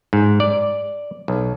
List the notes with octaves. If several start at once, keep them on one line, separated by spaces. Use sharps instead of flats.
G#2
D5
B1